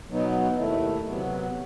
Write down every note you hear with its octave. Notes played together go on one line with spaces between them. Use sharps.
B2 F#3 B3 D#4
D#2 D#3 A3 E4
C3 F#3 B3 F#4